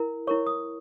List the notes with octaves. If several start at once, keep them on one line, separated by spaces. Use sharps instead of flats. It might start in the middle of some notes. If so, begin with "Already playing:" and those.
Already playing: E4 A#4
E4 A#4 C#5 C#6
D#6